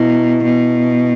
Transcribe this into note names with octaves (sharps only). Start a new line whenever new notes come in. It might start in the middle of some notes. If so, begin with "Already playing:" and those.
Already playing: B2 E4
B2